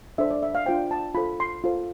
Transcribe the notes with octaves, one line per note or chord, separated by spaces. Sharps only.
D4 A4 C5 E5
D5
E5
F5
D4 F4 C5 G5
A5
F4 A4 C5 B5
C6
F4 A4 C5